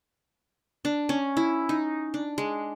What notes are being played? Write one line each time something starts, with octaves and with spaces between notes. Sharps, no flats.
D4
C#4
E4
D#4
D4
G#3